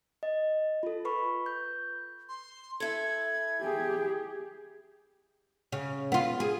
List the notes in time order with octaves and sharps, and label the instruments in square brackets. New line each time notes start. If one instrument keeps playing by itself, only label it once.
[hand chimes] D#5
F4 A4
B4 B5 C#6
G6
[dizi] C6
[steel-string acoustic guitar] E4 A4 [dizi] G#6
[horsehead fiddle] G4 G#4
[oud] C#3
B3 F4
G#4